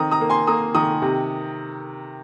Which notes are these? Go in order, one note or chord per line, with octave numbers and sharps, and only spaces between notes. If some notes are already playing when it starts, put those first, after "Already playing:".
Already playing: D#3 C4 A#5 D#6
A#5 D#6
A#3
G#5 C6
A#3 A#5 D#6
D#3 A#5 D#6
C3